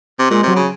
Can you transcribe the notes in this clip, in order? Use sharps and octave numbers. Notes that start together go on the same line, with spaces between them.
C3
A#2 G#3
C3 F#3
C#3